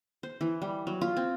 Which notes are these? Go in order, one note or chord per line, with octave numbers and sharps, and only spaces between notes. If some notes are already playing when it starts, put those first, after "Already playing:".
C5
E3
G3
F#3
F4
C4